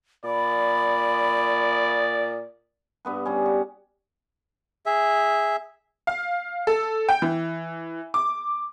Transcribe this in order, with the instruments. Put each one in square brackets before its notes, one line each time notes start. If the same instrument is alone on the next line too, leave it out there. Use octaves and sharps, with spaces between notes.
[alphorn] A#2 [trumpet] D5 [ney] B5
[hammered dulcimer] G2 B3 B4
G3 C#4
F#4
[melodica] G#4 E5
[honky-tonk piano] F5
A4
G5
E3
D6